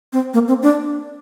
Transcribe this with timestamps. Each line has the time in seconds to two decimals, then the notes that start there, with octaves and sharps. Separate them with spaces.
0.13 C4
0.34 A#3
0.48 C4
0.63 D4